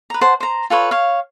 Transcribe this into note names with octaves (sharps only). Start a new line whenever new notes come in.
B4 A#5
C5 F#5 A5
C5 A#5
F4 A4 B4 C#5
C#5 F5